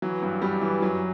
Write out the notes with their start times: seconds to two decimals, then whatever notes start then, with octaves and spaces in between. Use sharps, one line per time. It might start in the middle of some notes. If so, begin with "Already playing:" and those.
0.02 E3 F#3
0.22 G2
0.42 G2 G3
0.62 E3
0.82 F#2 F#3